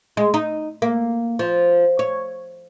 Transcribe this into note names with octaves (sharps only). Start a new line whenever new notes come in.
G#3
D#4
A#3
F3
C#5